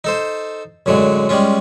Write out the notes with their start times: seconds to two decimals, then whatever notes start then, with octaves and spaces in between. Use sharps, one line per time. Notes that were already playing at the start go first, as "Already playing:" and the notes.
0.04 D#4 A4 C5
0.86 F#2 A2 D3 F#3 G#3
1.29 G3 G#3 C#4 F4